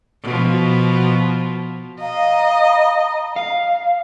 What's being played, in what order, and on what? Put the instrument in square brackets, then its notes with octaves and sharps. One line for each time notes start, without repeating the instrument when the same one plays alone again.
[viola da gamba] B2 F3
[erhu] D#5 [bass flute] F5 [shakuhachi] A#5
[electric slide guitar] F5